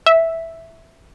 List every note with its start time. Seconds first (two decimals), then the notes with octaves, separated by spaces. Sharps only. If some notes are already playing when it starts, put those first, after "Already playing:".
0.06 E5